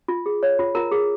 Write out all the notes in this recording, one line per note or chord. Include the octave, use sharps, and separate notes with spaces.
F4
G#4
C#5
F4
F4 A#4 A#5
G#4